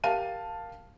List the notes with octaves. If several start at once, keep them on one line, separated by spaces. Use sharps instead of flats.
G4 A#4 F5 A5 D#7